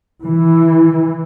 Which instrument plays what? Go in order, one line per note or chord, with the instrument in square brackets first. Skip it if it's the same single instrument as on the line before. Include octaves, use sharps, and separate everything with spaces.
[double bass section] E3